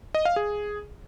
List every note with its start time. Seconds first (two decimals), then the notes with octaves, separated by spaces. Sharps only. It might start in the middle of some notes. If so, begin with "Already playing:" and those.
0.15 D#5
0.25 F5
0.36 G#4